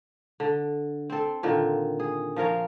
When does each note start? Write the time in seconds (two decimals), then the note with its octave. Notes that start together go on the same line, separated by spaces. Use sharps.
0.40 D3
1.10 C4 A4
1.43 A#2 D3 D#3
2.00 G#4
2.36 F3 F4 A#4 C#5